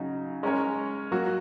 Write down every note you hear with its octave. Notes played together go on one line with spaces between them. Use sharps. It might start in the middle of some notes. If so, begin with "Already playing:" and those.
Already playing: C#3 F#3 D#4
G#3 C#4 A#4 C#5
F#3 A#3 F#4